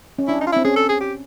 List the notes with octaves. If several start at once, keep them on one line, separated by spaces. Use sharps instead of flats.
C#4
D4 E4
D#4
F4
E4
C4
C#4 G#4
A4
G#4
G4